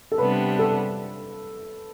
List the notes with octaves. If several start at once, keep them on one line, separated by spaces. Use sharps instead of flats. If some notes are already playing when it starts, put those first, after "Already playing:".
A4
C3 G3 B3 D4 B4
A4